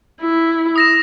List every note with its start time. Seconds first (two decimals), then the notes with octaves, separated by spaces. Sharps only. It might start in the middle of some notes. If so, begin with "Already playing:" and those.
0.21 E4
0.76 D#6 A#6 E7